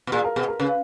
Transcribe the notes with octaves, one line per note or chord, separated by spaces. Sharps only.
B2
A#2 G#4
A#4
B2 G#4
A#4
C#3 B4